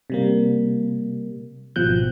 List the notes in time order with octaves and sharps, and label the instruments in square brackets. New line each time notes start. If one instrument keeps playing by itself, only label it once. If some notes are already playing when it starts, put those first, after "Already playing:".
[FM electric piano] C3 G3 A#3
G#1 B2 F3 F#6 G6